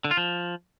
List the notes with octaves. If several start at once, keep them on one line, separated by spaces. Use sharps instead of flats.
D3
F4
F3